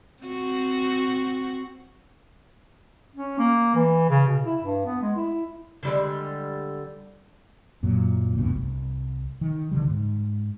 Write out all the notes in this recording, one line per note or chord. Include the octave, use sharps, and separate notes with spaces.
C4 F#4
C#4
A#3
E3
C#3
B2
E4
G2
B3
G#3
E4
D3 G3 G#3
F#2 A#2 F#3
F#1 D2 G2 B2
C2
D#3
C#2 D3 D#3 G3
G#2